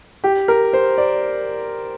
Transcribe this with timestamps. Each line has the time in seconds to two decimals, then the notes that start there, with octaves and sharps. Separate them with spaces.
0.24 G4
0.48 A#4
0.73 C5
0.98 D5